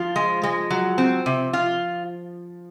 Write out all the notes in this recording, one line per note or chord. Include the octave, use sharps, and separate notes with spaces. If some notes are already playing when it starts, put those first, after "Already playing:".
Already playing: F3 F4
G#3
G#3
F#3
C4
C3
F4